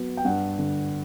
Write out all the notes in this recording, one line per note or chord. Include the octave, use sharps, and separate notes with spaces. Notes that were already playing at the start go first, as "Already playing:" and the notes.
Already playing: F#3 B3
G5
G2 F#5
D3